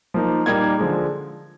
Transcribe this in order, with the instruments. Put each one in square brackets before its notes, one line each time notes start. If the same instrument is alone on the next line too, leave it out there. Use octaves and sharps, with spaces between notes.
[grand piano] F3 A#3 D#4
A#2 G3 A#3 D#4 G#6
D3 F3 G#3